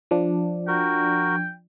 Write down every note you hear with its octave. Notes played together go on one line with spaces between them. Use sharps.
F3 D4
F#4 A#4 G5